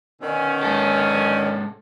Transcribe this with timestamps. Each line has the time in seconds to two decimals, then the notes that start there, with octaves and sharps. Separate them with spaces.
0.21 B2 D3 D#3 C#4
0.63 G#2 A4